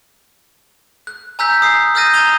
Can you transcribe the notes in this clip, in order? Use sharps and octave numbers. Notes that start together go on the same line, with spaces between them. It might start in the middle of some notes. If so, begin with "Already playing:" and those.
F#6
G#5 A#5 E6 F#6 G6 B6
D#6 C7
D#6 F6 G6 A6 A#6 D#7
A#5 G#6 D#7 F7 G7